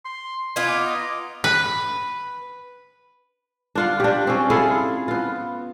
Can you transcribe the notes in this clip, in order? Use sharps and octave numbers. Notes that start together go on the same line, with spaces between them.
C6
B3 D#4 F4 G#5
D6
D#5
B4
D4 F4 F#5
D4 G4
C4 C#4
E4 F4 G#4 A4
B3 F4